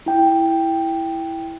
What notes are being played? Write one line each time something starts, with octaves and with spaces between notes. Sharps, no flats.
E4 G5